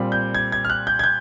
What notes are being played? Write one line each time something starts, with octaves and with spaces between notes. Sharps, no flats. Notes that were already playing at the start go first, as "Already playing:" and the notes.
Already playing: A#2 G3 C4
G6
G#6
G#6
F6
F#6
G6
G#6
G6